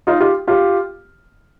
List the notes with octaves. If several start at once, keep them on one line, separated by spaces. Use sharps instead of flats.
D#4 F4
F4 G4
F4 G4